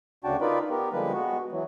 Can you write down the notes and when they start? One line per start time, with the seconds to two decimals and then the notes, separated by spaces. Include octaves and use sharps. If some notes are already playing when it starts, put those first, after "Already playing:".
0.24 D2 C#3 D4 F#4 G5 A5
0.41 D#4 F4 A#4 B4 D5 B5
0.70 B3 G4 A#4
0.93 D3 F3 G3 G#3 A#3 B4
1.13 G#3 B3 F#4
1.52 E3 F#3